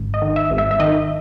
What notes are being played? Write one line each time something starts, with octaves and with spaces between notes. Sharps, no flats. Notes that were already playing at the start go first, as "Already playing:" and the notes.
Already playing: G#1 G#2
D#5
D#3
E5
G#1
E5
E5
D#3 D#5